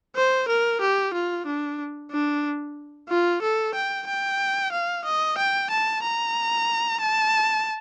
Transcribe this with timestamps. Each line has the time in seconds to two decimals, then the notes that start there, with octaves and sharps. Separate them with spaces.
0.16 C5
0.48 A#4
0.81 G4
1.14 F4
1.46 D4
2.12 D4
3.10 F4
3.42 A4
3.75 G5
4.07 G5
4.72 F5
5.05 D#5
5.38 G5
5.70 A5
6.03 A#5
7.01 A5